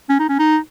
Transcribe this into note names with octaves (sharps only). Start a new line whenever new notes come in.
C#4
D#4
C#4
D#4